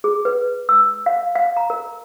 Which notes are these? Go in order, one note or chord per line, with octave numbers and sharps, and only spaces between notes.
G#4
B4
E6
F5
F5
A#5
A#4